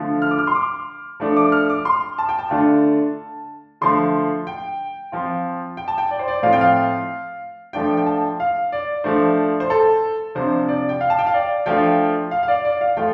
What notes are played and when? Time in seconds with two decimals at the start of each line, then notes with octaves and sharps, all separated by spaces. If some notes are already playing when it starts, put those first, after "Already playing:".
Already playing: D3 F3 A3 F4
0.22 F6
0.31 D6
0.39 F6
0.47 C6
0.55 D6
1.20 F3 A3 D4
1.37 D6
1.52 F6
1.69 D6
1.85 C6
2.18 A5
2.29 G5
2.39 A5
2.50 D3 A3 D4 F4
3.81 D3 F3 A3 C6
4.47 G5
5.12 F3 C4 F4
5.77 G5
5.88 A5
5.98 G5
6.11 D5
6.19 C5
6.28 D5
6.43 A2 F3 C4 F4 F5
6.53 G5
6.61 F5
7.73 F3 A3 D4 F4 G5
7.97 G5
8.06 A5
8.40 F5
8.72 D5
9.04 F3 A3 D4 C5
9.60 C5
9.70 A4
10.35 C3 F3 D4 C5
10.68 D5
10.89 G5
11.01 F5
11.10 A5
11.19 G5
11.26 F5
11.34 D5
11.66 F3 A3 D4 F4 G5
12.31 F5
12.43 F5
12.48 D5
12.65 D5
12.81 F5
12.97 F3 A3 F4 G5